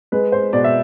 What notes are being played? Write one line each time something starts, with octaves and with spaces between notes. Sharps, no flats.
G#3 B4
C5
B2 D5
E5